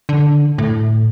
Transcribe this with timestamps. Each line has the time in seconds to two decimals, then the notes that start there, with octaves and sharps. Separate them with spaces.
0.09 D3
0.58 A2